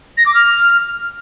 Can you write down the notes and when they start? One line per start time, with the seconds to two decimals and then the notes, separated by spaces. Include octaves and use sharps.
0.17 A#6
0.25 D6
0.34 F6